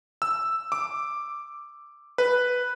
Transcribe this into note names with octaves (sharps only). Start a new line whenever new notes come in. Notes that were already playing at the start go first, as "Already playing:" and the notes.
E6
D6
B4